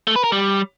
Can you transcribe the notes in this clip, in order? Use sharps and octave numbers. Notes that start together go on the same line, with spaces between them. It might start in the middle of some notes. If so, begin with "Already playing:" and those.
A3
B4
A#4
G3